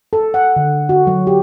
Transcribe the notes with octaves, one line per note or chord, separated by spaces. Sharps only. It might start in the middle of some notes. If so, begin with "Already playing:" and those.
A4
F#5
D3
F#4
F#3
G4